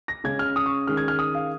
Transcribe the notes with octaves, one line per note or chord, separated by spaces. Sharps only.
A#6
C#3 G#3 C#4 G#6
F6
D#6
C#6
D#3 G#3 C#4 F6
G#6
F6
D#6
F5